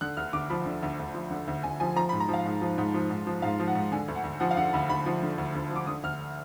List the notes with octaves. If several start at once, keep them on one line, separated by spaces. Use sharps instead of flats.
D3 F#6
D2 F6
D2 D6
F3 B5
D3
D2
D2
F3
D3
D2
D2 G#5
F3 G#5
F3 A#5
B5
G#2
A#5
F3 F5
G#2
F3
G#2
F3
G#2
F3
G#2 F5
F3
F#5
G#2
D3 G#5
D2
F#5
D2
F3 F#5
F5
D3 F#5
D2 B5
D2 B5
F3
D3
D2
D2
F3
D6
D3 D#6
D2 F6